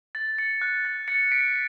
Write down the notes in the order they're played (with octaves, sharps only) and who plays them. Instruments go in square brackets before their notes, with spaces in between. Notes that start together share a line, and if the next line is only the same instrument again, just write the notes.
[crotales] A6
A6 C#7
F#6
A6
A6 C#7
B6 D7